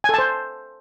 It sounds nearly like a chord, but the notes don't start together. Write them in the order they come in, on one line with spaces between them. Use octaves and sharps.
G#5 A4 A5 C5